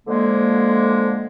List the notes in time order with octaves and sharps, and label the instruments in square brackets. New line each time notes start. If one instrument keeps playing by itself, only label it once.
[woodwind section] D3 F3 G#3 A#3